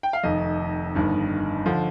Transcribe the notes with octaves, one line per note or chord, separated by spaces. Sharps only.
G5
F5
F1 F2 D#3 D#5
G1 G2 D#3
D3 F3